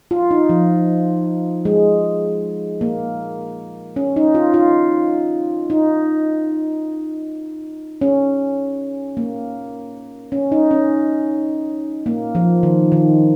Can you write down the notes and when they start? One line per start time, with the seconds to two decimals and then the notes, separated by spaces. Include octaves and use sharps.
0.11 F4
0.31 D#4
0.49 F3
1.65 G#3
2.81 A#3
3.96 C#4
4.16 D#4
4.35 F4
4.54 F4
5.70 D#4
8.01 C#4
9.17 A#3
10.32 C#4
10.52 D#4
10.71 C#4
12.06 A#3
12.35 F3
12.63 D#3
12.92 D#3